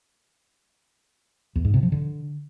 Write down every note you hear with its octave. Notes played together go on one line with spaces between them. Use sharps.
E2
G#2
C3
F3
D3